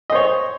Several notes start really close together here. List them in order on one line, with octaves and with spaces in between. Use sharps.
D#5 C5 C#5